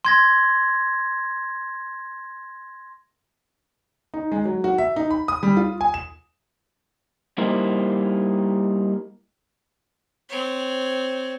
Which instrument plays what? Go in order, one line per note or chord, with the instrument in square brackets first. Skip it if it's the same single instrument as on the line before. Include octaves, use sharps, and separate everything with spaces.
[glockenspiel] C6 G#6 A#6
[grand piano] D#4
G#3
F#3
F#4
E5
D#4
B5
D#6
G3
F4
G#5
E7
[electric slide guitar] G3 A#3 D#4 E4 C5
[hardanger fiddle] C4 C#5